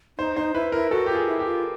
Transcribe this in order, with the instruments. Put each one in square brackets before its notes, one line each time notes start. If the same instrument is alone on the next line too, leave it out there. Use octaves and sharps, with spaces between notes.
[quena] D#4 [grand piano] C5
[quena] D#4 [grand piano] C5
[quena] E4 [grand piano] B4
[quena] E4 [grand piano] A#4
[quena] F#4 [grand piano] A4
[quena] F4 [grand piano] G4
[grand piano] G#4
[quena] E4
[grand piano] G4
[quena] F4